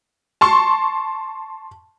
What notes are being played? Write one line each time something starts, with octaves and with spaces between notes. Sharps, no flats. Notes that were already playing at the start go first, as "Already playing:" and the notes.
A5 C6 C#6